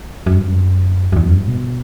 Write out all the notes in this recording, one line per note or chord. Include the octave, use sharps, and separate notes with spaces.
F#2
G2
F#2
F#2
E2
F#2
G2
B2